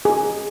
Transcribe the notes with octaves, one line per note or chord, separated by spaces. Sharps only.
G#4